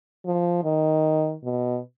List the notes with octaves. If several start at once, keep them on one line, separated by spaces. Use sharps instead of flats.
F3
D#3
B2